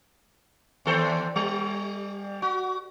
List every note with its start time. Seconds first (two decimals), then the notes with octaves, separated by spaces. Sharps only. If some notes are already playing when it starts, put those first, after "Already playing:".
0.86 D#2 A4 C5
1.36 G3
2.42 F#4